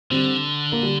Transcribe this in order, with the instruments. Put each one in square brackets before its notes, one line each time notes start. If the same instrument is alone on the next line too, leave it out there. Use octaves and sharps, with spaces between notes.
[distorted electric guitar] D3 [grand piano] G3 C4
[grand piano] A#3
G3